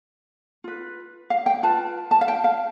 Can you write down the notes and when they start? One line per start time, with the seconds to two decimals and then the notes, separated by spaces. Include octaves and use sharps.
0.64 F4 B4
1.30 F5
1.46 G5
1.63 F4 B4 A5
2.11 A5
2.21 F5
2.28 G5
2.44 F5